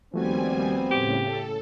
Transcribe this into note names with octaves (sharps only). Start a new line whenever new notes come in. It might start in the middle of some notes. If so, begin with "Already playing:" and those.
D#2 F3 G3 A3 B3 C4 F#4 G#5
A2 C#3 G4
A4